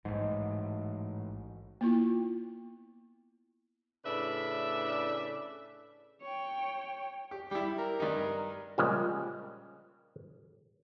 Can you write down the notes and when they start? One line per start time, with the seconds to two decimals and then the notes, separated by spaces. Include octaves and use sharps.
0.05 A1 G#2 D#3 E3 F#3 A5
1.81 A#3 B3 E4 F4
4.05 A2 C#3 D4 B4 D5 E5
6.22 C#5 G5
7.31 G4
7.51 G3 E4 G4
7.79 A#4
8.00 G2 D#4
8.78 A#2 C#3 F3 G3 G#3